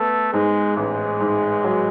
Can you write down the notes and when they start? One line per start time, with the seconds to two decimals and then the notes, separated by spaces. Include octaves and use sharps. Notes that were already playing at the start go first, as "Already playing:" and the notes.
Already playing: A3 B3
0.33 G#2 G#3
0.77 A1 G#3
1.20 G#2
1.64 F#3